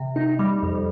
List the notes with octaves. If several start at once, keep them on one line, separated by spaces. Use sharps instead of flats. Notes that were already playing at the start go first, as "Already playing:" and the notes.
Already playing: C3
D#4
G3
F2